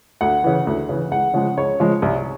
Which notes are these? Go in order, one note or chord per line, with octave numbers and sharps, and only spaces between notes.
D2 F#5
C#3 E3
D2
C#3 E3
C#2 F#5
C#3 F3 G#3
C#2 C#5
C#3 F3 G#3
C2